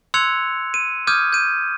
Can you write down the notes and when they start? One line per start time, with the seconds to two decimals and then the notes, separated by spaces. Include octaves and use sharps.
0.14 C6 E6 F#6 G#6 C#7 F7
0.74 D#7
1.07 D6 D#6 F6 G6 G#6 D#7
1.33 G6 D#7